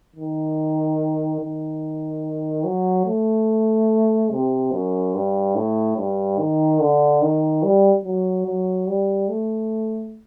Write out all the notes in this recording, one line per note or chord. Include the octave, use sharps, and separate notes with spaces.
D#3
D#3
F#3
A3
C3
F#2
G2
A2
G2
D#3
D3
D#3
G3
F#3
F#3
G3
A3